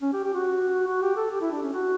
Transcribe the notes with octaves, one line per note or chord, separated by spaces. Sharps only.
C#4
G4
G4
F#4
F#4
G4
A4
G4
E4
D4
C#4
F#4